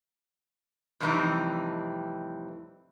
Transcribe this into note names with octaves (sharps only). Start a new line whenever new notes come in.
F2 A2 C3 E3 G3 D#4